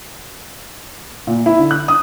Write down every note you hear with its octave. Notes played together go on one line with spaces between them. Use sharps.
A#2
E4
D3
F#6
D#6